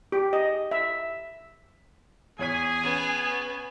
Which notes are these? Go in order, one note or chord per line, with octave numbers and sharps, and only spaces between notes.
G4
D#5
E5
E2 G#4 C#5 G#5 B6
B3 C#4 D#7